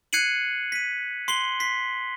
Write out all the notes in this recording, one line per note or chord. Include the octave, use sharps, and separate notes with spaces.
F#6 G#6 C7 C#7 D#7 F#7
B6 D#7
C6 C7 F#7 G7
B6 C7